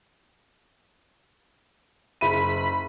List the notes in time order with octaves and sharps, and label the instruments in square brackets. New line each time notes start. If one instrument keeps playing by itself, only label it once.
[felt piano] F#1 E5 D#7 [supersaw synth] B5